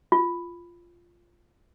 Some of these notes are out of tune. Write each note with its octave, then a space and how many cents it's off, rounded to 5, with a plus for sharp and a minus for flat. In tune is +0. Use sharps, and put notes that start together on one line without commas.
F4 -5